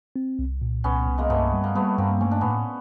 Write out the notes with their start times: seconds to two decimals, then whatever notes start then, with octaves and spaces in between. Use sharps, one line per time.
0.16 C4
0.39 C2
0.62 A#2
0.84 C2 B3 C#4
1.07 C2
1.18 G#3 A#3
1.30 G2 A3 B3
1.53 G3
1.64 A#3
1.75 G3 A3 B3
1.98 G2 A#3 C4
2.21 A3 C#4
2.31 D4
2.41 A2 B3 C#4